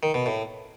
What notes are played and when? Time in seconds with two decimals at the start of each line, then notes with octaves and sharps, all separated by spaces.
0.03 D#3
0.14 B2
0.26 A2